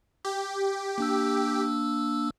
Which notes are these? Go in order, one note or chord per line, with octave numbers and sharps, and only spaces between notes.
G4
A#3 D4 E6